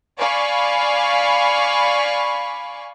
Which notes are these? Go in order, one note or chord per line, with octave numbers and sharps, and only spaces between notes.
D5 F5 G#5 B5 C#6